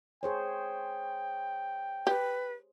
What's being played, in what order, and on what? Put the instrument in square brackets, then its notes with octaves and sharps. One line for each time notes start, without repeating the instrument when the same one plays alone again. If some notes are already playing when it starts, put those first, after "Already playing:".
[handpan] G#4 C5 C#5 [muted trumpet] G5
[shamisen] G4 [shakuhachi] B4